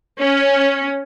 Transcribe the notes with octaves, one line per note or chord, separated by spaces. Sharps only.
C#4